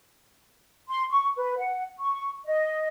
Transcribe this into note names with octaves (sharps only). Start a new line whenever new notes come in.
C6
C#6
B4
F#5
C#6
D#5